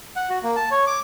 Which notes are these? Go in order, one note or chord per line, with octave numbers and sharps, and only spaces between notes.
F#5
F#4
A#3
A5
C#5
D6